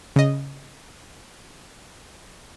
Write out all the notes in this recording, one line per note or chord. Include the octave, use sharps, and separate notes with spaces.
C#3 D#5